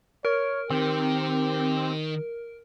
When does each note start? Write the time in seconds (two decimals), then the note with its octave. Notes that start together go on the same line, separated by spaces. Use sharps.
0.25 A#4 C#5
0.70 D#3 C4 G4